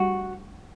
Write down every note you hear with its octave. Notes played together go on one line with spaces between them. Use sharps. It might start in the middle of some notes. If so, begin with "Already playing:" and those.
Already playing: F#4